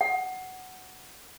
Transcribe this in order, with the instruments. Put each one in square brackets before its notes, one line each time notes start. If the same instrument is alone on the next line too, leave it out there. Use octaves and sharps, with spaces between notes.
[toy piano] F#5